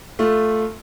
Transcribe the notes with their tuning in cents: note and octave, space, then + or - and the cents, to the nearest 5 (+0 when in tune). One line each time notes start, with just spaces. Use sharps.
A3 +0 F4 +5